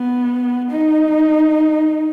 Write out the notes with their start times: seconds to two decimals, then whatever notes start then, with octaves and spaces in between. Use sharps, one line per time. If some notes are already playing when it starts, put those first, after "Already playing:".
Already playing: B3
0.71 D#4